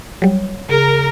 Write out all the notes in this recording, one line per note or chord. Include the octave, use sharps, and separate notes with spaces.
F#3 G3 C#5
C#3 G#4 A#4